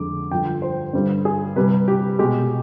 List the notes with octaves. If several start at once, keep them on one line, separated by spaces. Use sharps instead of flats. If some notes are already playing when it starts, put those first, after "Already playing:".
Already playing: F2 D3 G#3 D6
G2 D3 F3 G5
C5
G2 D3 G3 C5
G#4
C3 G3 B4
G4
B2 G#3 G4